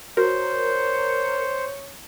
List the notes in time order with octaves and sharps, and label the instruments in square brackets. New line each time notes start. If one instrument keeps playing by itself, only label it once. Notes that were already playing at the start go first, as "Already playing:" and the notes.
[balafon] F#4 [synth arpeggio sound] A#4 [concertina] C5 [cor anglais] C#5